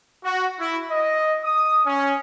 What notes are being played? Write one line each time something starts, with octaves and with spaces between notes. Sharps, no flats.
F#4
E4
D#5
D#6
C#4